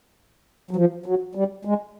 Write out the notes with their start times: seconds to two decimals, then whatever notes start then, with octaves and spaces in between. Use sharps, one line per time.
0.71 F#3
0.76 F3
1.06 F#3
1.35 G3
1.65 G#3